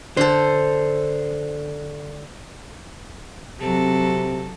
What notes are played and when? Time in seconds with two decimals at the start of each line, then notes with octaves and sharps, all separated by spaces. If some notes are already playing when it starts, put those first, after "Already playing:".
0.17 D3 A4 C5
3.61 C3 F#3 C4 A4